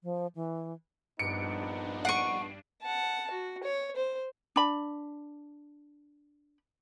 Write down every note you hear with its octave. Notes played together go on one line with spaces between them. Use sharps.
F3
E3
A#1 G2 B3 D4 D#4 C#7 D7
F#5 C#6 C7 D7 D#7
F#5 A5
F#4
C#5
C5
D4 B5